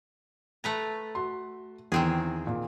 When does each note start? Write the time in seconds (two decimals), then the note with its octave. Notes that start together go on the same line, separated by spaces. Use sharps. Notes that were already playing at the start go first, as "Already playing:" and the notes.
0.64 A3 B4 A#5
1.15 F#4 C6
1.92 E2 D#3 E3 C4 G#4
2.47 A#2